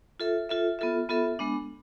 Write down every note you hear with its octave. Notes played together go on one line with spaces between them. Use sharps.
F4 A4 E5
F4 A4 E5
B3 F4 A4 E5
B3 F4 A4 E5
G#3 B3 D4